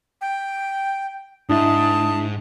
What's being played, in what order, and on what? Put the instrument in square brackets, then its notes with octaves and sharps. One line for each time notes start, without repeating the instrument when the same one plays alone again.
[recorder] G5
[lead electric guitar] G#2 [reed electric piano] D4 E4 E5 [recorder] A5 [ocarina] D#6